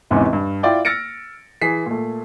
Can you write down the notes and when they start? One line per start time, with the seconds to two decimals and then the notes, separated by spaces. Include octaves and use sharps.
0.11 G#1 E2 G#2 C3 E3 C#4
0.33 G2
0.63 E4 F4 D5 G5
0.85 E6 F6 A6 A#6 C#7 D7
1.62 E3 G#4 B6 C7
1.86 A#2 A3